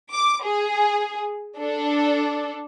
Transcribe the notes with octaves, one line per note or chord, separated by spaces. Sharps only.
D6
G#4
D4 A4